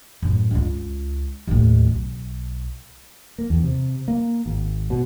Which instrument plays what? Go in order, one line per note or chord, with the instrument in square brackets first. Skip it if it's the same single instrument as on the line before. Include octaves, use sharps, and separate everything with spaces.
[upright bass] F#2 A2
C#2 F4
D#2 A2
B1
[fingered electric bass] A#3
E2
C3
A#3
G#1
B2